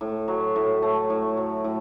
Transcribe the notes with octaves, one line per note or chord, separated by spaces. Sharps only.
A2
F#3
A2
A3
A2
F#3
A2